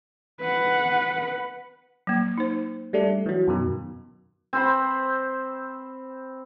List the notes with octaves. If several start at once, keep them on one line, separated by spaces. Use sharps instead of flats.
B4 F#5
F#3 A#3
D#4 C5
G3 A3 D4
E3 F#3
F#2 B2 D#3
C4 C5 B5